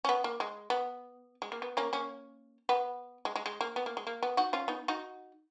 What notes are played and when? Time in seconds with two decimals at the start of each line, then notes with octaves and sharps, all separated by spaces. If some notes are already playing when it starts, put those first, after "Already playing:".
0.05 C#4
0.09 B3
0.24 A#3
0.40 G#3
0.70 B3
1.42 G#3
1.52 A#3
1.62 B3
1.77 A#3 C#4
1.93 A#3 C#4
2.69 B3
3.25 G#3
3.36 G#3
3.46 G#3
3.61 A#3
3.76 B3
3.86 A#3
3.97 G#3
4.07 A#3
4.23 B3
4.37 D#4 F#4
4.53 C#4 F4
4.68 B3 D#4
4.88 D#4 F#4